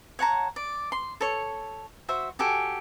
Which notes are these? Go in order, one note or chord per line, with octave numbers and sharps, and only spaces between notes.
C#5 F#5 A5 A#5
D5
C6
A4 C#5
F#4 C5 E5
F#4 G4 A4 G#5